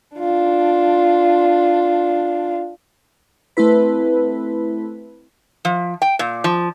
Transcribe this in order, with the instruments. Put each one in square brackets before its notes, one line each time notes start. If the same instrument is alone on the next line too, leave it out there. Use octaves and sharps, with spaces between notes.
[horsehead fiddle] D4 F4
[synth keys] A3 C4 E4 B4
[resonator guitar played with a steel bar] F3
G5
A#2
F3